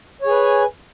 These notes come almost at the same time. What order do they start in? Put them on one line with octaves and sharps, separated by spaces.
C#5 G#4 B4 G#5